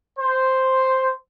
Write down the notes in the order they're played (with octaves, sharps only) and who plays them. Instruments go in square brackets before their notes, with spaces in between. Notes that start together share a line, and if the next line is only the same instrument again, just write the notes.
[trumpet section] C5